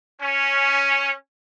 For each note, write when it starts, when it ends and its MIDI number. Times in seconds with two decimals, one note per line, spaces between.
0.22 1.12 61